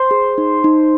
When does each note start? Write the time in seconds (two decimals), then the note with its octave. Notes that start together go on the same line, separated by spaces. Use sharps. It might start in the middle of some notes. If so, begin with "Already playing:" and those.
Already playing: C5
0.11 G#4
0.38 D#4
0.64 D#4